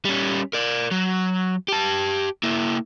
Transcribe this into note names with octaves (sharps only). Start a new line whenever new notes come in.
G3 C#4
A#4 D5
F#3
G4 A5
A#3 E4